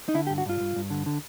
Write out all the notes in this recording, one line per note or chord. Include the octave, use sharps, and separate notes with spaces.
D#4
D3 E4
G4
G2
F#4
G2 F4
G2
G2
D3
D3